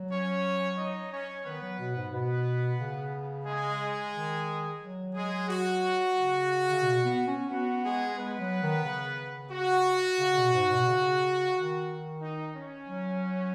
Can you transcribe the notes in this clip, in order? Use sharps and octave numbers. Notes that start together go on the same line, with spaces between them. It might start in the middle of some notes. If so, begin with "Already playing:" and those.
Already playing: F#3
C#4 C#5
D#4 D#5
C#4 C#5
D#3 B3 B4
F#3
B2
G#2
B2 B3 B4
C#3
G#3 G#4
D#3
F#3
G#3 G#4
F#4
C#3
C#3
B2
B3
C#4
B3 F#4
G#3 G#4
G#3 B3 B4
F#3
D#3
C#3
F#4
C#3
B2
G#2
B2
C#3
D#3
D#4
C#4
F#3